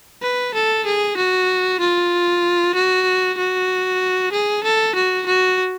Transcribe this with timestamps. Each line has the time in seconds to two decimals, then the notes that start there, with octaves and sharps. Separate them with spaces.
0.22 B4
0.55 A4
0.86 G#4
1.17 F#4
1.80 F4
2.75 F#4
3.38 F#4
4.32 G#4
4.64 A4
4.95 F#4
5.27 F#4